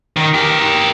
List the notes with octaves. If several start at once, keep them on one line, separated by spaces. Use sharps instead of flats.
D#3
G4 A#4